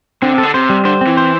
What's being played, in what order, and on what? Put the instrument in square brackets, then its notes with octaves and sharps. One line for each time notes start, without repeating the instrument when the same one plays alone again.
[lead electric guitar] D3 [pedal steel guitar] C4
[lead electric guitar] C3
[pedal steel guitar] A4
[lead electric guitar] D3
[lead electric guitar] C3 [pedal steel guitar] C5
[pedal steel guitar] G3
[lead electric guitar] D3 [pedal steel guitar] C5
[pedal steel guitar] C4
[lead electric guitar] E3
[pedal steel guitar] C5